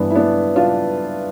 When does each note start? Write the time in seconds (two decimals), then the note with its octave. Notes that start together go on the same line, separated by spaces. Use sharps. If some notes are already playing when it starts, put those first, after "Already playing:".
Already playing: G2 E3 B3 D4
0.10 E4
0.15 B3 D4
0.56 D4 F4